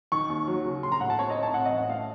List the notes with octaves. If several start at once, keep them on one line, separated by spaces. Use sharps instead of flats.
D#3 C#6
D#2
F#3
C#3
A#1 C6
A#5
A2 F#5
A5
C4 C#5
D#5
C4
A5
A2 F#5
D#5
A1
F#5
A3 F5